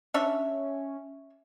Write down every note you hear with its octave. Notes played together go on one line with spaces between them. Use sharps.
C#4 D4 C#5 E5